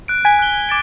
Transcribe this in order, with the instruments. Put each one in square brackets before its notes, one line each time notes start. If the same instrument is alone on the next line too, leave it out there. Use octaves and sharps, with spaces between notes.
[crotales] F#6 D7
[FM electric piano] G#5 G#6 [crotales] B6
[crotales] F#6 G7
D6 A6 D7